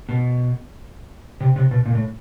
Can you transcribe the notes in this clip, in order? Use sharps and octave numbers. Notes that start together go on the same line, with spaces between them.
B2
C3
C3
B2
A#2
A2